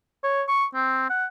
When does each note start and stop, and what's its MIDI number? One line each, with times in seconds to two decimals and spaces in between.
0.24 0.43 73
0.48 0.65 85
0.75 1.07 60
1.10 1.26 78